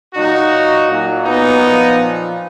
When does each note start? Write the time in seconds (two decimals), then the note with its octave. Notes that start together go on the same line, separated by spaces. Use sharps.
0.15 A#2 F#3 D#4 F#4
0.89 A#2 F#3
1.25 B3 D#4
1.62 A#2 F3